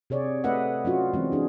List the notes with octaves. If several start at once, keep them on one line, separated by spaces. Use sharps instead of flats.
C3 G#4 C#5 D5
A3 B4 D#5 E5 F#5
F#3 C#4 F4 F#4
E3 G#3 C4 C#4
D4 G#4